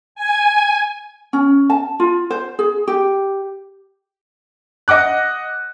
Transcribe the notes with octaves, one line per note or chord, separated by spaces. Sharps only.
G#5
C#4
A5
F4
C5
G#4
G4
D#5 F#5 D6 F#6